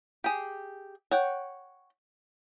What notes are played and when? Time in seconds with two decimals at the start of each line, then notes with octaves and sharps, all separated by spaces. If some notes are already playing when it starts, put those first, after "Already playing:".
0.24 G4 G#4
1.11 C#5 F#5 G5